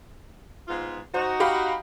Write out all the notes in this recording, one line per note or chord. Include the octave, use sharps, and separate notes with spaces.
G#2 B3 F4
D#4 F#4 C5
G4 F5 B5